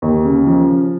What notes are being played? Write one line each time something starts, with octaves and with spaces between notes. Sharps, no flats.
D#2
C#3
F3